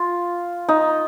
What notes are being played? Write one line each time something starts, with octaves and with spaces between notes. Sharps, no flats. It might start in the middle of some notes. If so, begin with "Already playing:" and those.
Already playing: F4
D#4